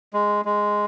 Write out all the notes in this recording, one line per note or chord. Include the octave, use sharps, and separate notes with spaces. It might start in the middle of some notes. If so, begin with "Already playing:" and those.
G#3
G#3